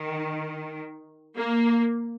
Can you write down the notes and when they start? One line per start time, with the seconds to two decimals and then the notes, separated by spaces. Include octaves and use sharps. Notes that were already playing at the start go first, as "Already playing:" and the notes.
Already playing: D#3
1.37 A#3